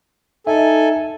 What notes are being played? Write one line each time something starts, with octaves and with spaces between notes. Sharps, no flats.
D#4 A4 E5 G#5